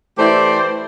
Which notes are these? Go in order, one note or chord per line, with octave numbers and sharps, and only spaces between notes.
E3 A3 E4 G4 C5 D5